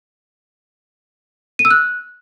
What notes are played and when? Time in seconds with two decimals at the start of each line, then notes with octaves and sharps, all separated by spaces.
1.59 D#7
1.65 E6
1.71 F#6